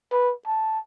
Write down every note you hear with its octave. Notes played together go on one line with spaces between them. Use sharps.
B4
A5